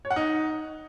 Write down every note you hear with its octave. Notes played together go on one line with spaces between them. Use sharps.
C#5
F#5
D#4